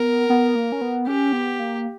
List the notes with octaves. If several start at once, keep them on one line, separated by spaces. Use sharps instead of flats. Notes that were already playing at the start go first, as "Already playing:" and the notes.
Already playing: B3 A#4
B3
A#3
C#4
B3
C#4 G4
B3
A#3